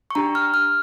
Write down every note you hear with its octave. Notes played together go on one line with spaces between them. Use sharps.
C#6
D4 G4 A#5
F6
F6